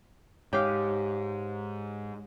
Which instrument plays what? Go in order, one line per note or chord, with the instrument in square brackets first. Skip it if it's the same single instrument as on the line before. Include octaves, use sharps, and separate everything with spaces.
[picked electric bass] G#2 [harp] G4 F5 [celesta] C#5